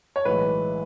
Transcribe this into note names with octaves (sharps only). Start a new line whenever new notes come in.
C#5
B1 A2 E3 G#3 B4